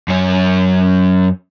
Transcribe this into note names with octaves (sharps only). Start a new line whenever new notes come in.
F#2 C#4